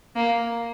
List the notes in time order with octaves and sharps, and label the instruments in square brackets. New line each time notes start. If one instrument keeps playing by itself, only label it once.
[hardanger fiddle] A#3